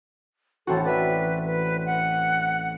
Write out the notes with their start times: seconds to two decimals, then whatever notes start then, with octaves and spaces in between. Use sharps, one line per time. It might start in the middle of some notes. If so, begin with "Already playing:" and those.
0.67 A1 C4 F#4 A4
0.85 B4 D5 E5
1.46 B4
1.86 F#5